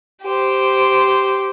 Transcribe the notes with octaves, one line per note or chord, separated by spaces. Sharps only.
G4 C5